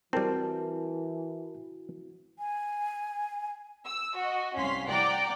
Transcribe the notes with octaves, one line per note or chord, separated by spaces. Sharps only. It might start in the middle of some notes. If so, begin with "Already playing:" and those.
E3 G3 C4 E4 F#4 A#4 A5
G#5
E6
F#4 D#5
C2 C#4 F5 C6 B6
D5 F#5 G5 A#5 D6